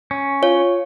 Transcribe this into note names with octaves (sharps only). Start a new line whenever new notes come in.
C#4
F4 C#5